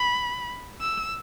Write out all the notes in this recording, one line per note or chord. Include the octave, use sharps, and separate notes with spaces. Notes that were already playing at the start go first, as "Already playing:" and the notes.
Already playing: B5
E6